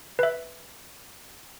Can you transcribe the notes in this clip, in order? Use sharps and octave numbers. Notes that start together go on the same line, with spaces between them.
B4 E5